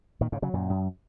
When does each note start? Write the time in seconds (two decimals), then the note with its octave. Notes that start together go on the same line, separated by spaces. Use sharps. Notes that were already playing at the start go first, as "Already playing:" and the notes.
0.21 A#2 D#3
0.32 G#2 C#3
0.42 C#3 F#3
0.54 F#2 A#2
0.70 F#2